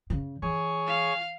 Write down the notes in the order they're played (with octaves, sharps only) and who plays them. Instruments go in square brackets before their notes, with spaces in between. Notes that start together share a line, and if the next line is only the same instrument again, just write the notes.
[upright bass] C#3
[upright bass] E3 [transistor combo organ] G#4 C#5
[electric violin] F5